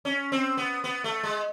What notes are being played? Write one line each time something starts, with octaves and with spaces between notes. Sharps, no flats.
C#4
C4
B3
B3
A3
G#3